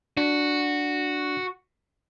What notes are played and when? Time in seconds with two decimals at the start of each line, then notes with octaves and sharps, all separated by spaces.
0.17 D4 F#4